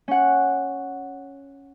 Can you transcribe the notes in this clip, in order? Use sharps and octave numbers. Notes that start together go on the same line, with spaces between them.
C#4 F#5